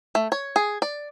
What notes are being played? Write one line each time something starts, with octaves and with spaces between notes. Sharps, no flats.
A3
C#5
G#4
D5